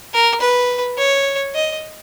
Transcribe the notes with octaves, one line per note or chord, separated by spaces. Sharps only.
A#4
B4
C#5
D#5